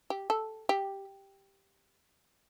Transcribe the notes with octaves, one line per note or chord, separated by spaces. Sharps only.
G4
A4
G4